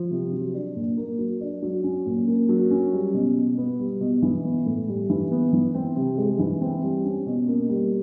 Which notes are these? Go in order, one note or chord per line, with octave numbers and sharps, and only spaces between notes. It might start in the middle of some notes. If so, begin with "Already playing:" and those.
Already playing: F3
C3
F#3
D4
A#2
A#3
F#3
D4
F#3
C#4
A#2
A#3
F#3
C#4
G3
B2
B2
B3
G3
B2
E3
B3
A2
G3
E3
B3
E3
C4
C3
G#3
E3
C4
G3
C#4
B2
A#3
G3